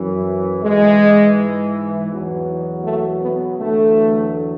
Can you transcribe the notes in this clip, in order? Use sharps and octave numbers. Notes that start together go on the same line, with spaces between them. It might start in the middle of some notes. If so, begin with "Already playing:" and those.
Already playing: F#2 E3
G#2 E3 G#3
E2 B2 F#3
A3
B3
E2 D3 F#3 A3